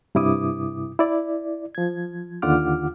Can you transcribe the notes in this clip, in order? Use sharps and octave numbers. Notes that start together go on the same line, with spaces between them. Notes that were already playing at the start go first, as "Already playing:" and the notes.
G2 C3 E4 D6 D#6
E4 D5
F3 G#6
D#2 D3 F4 F#5 D6 F6